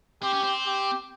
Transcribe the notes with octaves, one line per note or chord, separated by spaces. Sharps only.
C4 G4
C#4
C4
G4